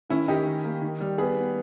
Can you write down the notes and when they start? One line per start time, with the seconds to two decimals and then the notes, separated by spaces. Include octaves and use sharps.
0.10 D#3 C#4 E4
0.28 D#3 D#4 G4
0.46 D#3
0.64 A#3
0.82 D#3
1.00 G3
1.18 B3 G#4 B4
1.36 B3